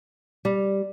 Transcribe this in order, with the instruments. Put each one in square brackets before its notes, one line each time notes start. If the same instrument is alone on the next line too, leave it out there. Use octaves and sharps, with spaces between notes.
[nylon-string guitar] G3